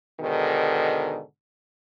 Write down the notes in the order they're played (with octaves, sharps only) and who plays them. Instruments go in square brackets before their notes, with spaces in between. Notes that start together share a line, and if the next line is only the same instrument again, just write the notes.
[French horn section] G#2 B2 D3 D#3